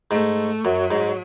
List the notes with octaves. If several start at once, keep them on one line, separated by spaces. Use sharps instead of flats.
G#2 A3
F#2 F#3
G#2